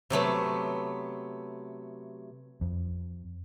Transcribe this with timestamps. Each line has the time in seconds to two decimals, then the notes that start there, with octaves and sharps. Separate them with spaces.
0.10 C3 F#3 A3 B3
2.61 F2